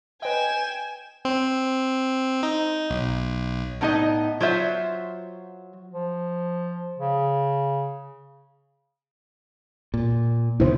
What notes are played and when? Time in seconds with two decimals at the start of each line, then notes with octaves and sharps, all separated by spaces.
0.22 B4 D#5 G5 G#5 E7
1.25 C4
2.43 D#4
2.90 B1
3.81 A2 B3 D#4 F4 D#5
4.40 F#3 F4 C5 E5
5.92 F3
6.99 C#3
9.94 A#2
10.60 D2 C3 B3 E4 C5